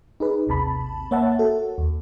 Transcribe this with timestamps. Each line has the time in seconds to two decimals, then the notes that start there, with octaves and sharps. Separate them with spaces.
0.20 D#4 G#4 B4
0.47 A1 D#2 C3 A5 B5
1.11 A#3 C#5 E5 F#5 A5
1.39 F#4 A4
1.78 D#2